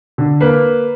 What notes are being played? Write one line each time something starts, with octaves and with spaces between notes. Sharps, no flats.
D3
A#3 B4